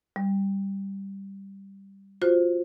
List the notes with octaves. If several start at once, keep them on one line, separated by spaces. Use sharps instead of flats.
G3
F4 F#4 C5